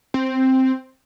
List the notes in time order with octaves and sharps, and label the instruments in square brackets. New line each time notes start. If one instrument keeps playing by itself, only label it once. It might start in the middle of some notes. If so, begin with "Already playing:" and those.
[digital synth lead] C4